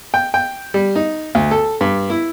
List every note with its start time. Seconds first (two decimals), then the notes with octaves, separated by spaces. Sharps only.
0.14 G5
0.34 G5
0.74 G3
0.96 D#4
1.35 D2
1.51 A4
1.81 G2
2.10 E4